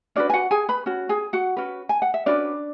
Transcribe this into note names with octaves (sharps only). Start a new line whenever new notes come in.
C#4 D4 F#4 B4 D5
G#5
F#4 F#5
G#4 G#5
B4 B5
C#4 F#4
G#4 G#5
F#4 F#5
C#4 F#4 B4
G#5
F#5
E5
C#4 D4 F#4 B4 D5